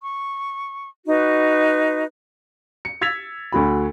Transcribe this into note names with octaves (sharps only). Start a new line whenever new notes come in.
C#6
D#4 F#4 B4
C#7
E6 G#6 A6 B6 F7
D2 F#4 B5